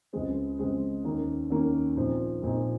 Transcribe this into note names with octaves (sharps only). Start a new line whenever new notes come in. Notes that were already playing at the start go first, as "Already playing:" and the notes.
C#2 C#3 G#3 C4
C#2 C#3 G#3 C4
D#2 D#3 A#3 C#4
D#2 D#3 A#3 C#4
A#1 A#2 F3 C4 D#4
A#1 A#2 F3 C4 D#4